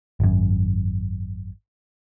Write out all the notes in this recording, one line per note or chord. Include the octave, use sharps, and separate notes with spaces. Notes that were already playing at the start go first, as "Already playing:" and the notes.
G#1 F#2